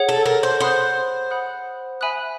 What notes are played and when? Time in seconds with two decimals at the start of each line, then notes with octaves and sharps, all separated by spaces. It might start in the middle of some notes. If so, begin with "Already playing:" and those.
Already playing: G#4 C#5 F#5
0.09 A4
0.26 A#4
0.43 C5
0.60 C5 F#5 B5 D#6 F#6
1.31 F#5 B5 D#6 F#6
2.01 E5 G#5 B5 D#6 F#6